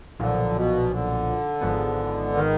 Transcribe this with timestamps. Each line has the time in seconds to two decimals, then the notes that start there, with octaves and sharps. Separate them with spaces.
0.20 B1 A#2 D3 F3
0.54 B2
0.91 D3
1.61 G#1 G#2 F3 G#3 B3
2.33 D#3